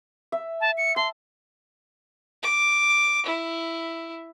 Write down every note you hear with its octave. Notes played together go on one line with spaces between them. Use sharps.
E5
A5
C#7
A5 C6
D6
E4